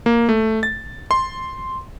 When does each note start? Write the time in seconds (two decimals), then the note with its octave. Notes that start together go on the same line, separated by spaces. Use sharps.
0.06 A#3
0.29 A3
0.63 A6
1.11 C6